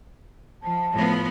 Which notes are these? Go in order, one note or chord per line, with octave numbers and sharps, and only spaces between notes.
F3 A5
A2 F3 B3